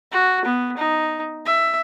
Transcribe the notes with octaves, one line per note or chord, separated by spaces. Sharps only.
F#4
B3
D#4
E5